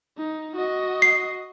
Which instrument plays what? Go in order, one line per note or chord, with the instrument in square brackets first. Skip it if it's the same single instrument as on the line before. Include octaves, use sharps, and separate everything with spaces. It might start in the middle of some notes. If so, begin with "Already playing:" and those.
[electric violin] D#4
F#4 D#5
[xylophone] C7